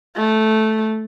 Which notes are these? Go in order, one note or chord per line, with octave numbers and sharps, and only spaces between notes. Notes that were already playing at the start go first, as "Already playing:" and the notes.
A3